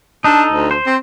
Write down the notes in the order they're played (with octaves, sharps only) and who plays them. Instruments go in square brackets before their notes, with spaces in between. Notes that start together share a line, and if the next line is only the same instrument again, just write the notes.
[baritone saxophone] D4 [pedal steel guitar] D#4 A4
[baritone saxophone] D2
[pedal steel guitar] C5
[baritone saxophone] C4